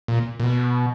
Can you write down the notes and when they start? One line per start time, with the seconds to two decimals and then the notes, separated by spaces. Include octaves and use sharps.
0.08 A#2
0.40 A#2
0.43 B2